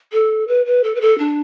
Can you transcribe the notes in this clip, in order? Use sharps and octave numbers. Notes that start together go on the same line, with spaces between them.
A4
B4
B4
A4
B4
A4
D4